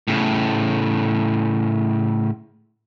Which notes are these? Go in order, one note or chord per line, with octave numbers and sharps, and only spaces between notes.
A2 C#3